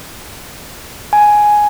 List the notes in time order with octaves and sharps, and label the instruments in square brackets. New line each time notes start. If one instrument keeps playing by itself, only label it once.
[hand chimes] G#5